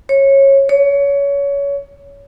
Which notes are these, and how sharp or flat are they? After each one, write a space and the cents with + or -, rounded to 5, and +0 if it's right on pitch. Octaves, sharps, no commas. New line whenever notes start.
C#5 -20
C#5 +25